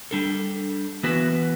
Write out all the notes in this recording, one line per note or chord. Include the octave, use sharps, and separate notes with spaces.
G3 D4 A4
E3 B3 F#4 B4